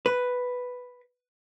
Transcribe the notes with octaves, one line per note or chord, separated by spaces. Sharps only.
B4